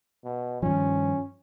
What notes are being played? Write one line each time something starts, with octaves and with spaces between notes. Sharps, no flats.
B2
G2 D#3 F3 C#4